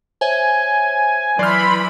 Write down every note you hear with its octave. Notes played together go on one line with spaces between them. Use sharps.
C5 C#5 E5 G#5
E3 F#3 D5 B5 C6 F6 G6